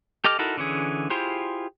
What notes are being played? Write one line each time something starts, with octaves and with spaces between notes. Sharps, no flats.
G4 A4 D#5 D6 F6
D#4 E4 F#4 A4 A#4
D3 E3 C#4 G#4
E4 F4 G4 G#4 C5